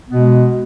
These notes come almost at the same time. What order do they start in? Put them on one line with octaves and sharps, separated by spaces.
B3 B2 G#3